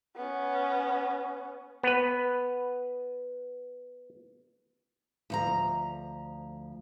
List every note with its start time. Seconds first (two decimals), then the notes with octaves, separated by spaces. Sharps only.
0.16 B3 C#4
1.83 B3 B4
5.30 D2 F3 A#5